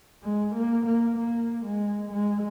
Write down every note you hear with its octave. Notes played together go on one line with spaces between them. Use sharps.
G#3
A#3
A#3
A#3
G#3
G#3